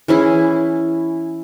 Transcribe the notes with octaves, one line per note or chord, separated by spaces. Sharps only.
E3 C#4 E4 G#4